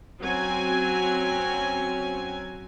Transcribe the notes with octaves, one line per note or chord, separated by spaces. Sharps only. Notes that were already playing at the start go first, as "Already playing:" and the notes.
F#3 C4 C#4 G#5